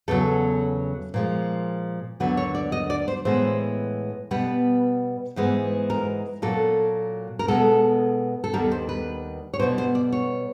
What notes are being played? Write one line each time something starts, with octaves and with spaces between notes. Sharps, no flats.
E2 C#3 F#3 A4
A#2 F3 G#3
D#2 D3 F#3 B3 B4
C#5
D5
D#5
D5
C5
A2 E3 G#3 B3 C5
B2 G3 B3 B4
G#2 E3 G#3 B3
A#4
A#2 F#3 A#3 A4
A#4
B2 G#3 B3 A4
A4
D#2 D#3 G3 B3 A#4
C5
B4
C#5
B2 G3 B3 C5
C5
D5
C#5